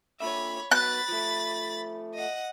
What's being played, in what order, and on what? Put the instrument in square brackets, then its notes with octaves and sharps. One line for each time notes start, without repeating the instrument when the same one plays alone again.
[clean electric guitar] A#2 D3 E5 [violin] C#5 B5
[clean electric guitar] F#3 B3 [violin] B5 A6 [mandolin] F#6
[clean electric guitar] F3 A3
[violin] D#5 F#5